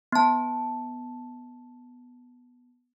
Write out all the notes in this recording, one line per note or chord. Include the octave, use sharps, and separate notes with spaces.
B3 A5